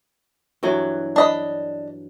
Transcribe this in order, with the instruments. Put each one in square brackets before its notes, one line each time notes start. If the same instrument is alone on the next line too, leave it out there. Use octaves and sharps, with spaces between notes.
[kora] G2 E3 F#3
[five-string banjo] D4 D#5 B5